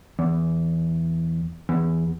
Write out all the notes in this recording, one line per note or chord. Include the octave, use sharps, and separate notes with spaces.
E2
E2